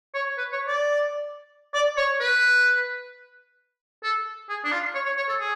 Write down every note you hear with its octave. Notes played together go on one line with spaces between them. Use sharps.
C#5
B4
C#5
D5
D5
C#5
B4
A4
G#4
D4
F4
C#5
C#5
C#5
A4
G#4